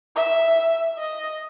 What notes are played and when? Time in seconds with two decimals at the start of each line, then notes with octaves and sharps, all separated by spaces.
0.16 E5
0.98 D#5